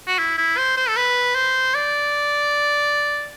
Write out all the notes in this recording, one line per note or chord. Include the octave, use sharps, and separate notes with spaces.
F#4
E4
E4
C5
C5
A4
B4
C5
D5